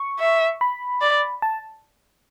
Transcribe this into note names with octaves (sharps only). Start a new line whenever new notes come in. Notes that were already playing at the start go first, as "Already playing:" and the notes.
Already playing: C#6
E5
B5
D5
A5